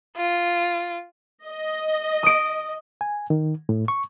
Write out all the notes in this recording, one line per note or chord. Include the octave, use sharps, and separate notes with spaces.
F4
D#5
D#6 D7
G#5
D#3
A2
C#6